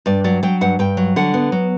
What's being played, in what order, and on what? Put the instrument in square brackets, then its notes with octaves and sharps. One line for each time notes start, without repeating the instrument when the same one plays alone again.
[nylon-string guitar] G2 D5
F#3 D5
F#3 G5
G2 F#5
G2 G5
F#3
D3 F#5
B3
F#3